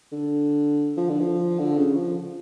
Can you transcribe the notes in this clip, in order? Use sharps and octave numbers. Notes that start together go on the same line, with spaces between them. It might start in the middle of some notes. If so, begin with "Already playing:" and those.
D3
F3
D3
F3
D3
C#3
F3